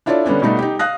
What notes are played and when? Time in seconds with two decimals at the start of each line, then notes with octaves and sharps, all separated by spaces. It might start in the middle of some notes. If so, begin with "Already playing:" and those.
0.06 D4 E4 F4 A4 C#5 D5
0.26 D3 G3 B3 C#4 D4
0.42 B2 G3 A3 D#4
0.59 D#4 G4
0.79 F5 D#6 F#6 A#6